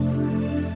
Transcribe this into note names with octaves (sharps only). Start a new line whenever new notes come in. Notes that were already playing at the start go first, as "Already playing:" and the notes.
Already playing: F2 C3 A3 D4
A5